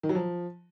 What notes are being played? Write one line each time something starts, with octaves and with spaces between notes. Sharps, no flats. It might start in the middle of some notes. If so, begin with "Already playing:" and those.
D#3
F#3
F3